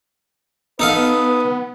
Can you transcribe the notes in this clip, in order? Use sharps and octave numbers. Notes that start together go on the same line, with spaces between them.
B3 D#4 A4 B4 F5 D#6